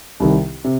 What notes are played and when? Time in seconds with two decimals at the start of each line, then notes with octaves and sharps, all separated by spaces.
0.20 C2 C3 D#3
0.64 C3